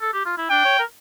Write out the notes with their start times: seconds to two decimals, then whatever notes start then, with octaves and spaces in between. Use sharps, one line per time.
0.01 A4
0.14 G4
0.26 F4
0.38 E4
0.50 D4 G5
0.65 C#5
0.79 A#4